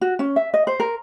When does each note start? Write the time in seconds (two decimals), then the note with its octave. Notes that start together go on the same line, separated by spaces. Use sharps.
0.01 F#4
0.19 C#4
0.36 E5
0.54 D#5
0.67 C5
0.80 A#4